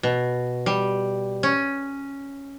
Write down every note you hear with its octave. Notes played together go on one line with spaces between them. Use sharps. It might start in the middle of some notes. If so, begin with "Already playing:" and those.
B2
G3
C#4